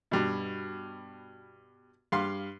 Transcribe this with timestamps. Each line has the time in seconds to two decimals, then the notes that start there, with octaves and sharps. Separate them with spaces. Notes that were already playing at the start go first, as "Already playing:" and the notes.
0.11 G2 B2
2.12 G2 F5 C6